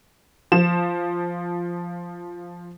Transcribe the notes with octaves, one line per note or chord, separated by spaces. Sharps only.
F3 E7